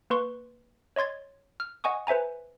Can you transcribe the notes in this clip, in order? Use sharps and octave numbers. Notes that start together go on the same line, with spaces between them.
A#3 B4 C6 C#6
C#5 D#5 C6 G#6 A6
F6
D#5 F#5 G#5 C#6 D#6
B4 C5 E5 G#5 A#5